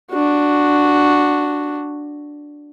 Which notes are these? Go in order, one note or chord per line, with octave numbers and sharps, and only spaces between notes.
D4 F#4